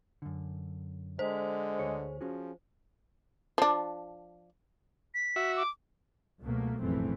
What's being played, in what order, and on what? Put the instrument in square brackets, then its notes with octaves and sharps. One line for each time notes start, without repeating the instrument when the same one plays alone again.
[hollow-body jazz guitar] F#2 D3
[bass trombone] D3 [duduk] G#3 [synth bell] C5
[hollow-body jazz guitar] D2 G#4 C#5
[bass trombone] F3 [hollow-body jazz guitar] C#4 F#4 G#4
[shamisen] F3 D4
[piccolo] B6
[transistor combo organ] F#4 E5
[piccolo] D6
[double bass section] C#2 B2 F#3 A3 A#3
F1 A#1 F#2 E3 A3 C4